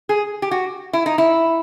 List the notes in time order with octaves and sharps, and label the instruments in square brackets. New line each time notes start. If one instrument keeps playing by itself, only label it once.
[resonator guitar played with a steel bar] G#4
G4
F#4
E4
D#4
E4